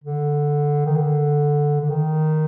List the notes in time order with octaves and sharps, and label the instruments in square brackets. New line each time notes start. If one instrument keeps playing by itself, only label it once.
[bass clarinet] D3
D#3
D3
D3
D#3